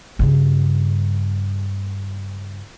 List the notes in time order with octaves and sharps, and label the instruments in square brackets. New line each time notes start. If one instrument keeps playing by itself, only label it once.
[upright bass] G2 C#3